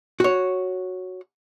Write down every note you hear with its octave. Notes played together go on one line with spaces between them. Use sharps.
F#4 C#5